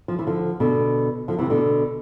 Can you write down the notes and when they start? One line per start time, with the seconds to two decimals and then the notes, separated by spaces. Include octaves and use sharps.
0.08 F3
0.19 E3
0.27 D3 F3
0.60 B2 D3
1.28 D3 F3
1.39 C3 E3
1.50 B2 D3